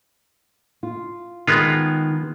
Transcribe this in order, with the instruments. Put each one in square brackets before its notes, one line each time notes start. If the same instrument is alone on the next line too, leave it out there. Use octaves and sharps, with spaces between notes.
[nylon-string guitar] F4
[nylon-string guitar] D#3 [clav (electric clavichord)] G#3 B3 F4